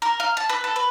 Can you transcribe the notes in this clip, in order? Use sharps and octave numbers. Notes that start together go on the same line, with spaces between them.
A#4
F5
A5
B4
A4
B4